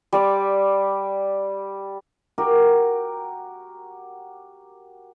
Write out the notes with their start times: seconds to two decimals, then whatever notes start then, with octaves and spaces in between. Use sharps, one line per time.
0.13 G3 D5 D6
2.38 F#4 G4 A#4